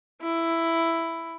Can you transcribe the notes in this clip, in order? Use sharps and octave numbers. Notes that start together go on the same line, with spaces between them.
E4